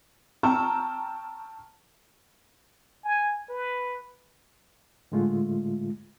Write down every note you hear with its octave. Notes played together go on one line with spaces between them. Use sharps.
G5 A5 A#5 C#6 E6 F6
G#5
B4
A2 D3 G#3 A3 F4